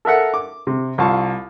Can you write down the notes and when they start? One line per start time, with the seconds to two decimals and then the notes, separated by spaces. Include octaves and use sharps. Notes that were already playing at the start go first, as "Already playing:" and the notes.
0.05 A4 A#4 E5 F#5
0.34 D6
0.67 C3
0.98 C2 F4 F5 A5 C#6